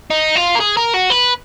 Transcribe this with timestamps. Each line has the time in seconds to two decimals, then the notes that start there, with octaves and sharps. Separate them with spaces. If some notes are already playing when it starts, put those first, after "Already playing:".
0.10 D#4
0.35 F4
0.55 A#4
0.60 G#4
0.77 A#4
0.94 F#4
1.10 B4